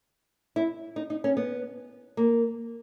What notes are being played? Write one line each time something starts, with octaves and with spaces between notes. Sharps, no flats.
E4
D#4
D#4
C#4
B3
A#3